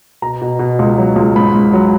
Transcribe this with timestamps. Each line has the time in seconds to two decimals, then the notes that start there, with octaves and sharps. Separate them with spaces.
0.22 B2 A#5
0.42 B2
0.59 B2
0.79 C#2
0.98 F#3
1.16 C#2
1.36 G#2 B5
1.55 G#2
1.73 F#3